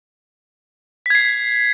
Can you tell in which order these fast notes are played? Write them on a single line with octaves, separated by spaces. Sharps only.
B6 G#6 C7